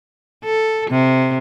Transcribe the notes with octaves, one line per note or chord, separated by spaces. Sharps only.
A4
C3